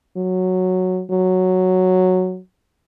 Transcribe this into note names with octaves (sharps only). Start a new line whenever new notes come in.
F#3
F#3